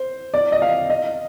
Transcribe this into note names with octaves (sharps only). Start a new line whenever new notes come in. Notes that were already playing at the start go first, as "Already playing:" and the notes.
Already playing: C5
D5
D#5
F5
D#5